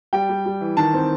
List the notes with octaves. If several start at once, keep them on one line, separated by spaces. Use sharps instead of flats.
G3 G5
G3
G3
E3
D#3 A5
C4